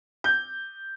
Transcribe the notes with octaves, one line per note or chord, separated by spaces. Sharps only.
G6